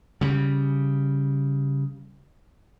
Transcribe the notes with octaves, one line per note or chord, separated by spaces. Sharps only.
C#3 G3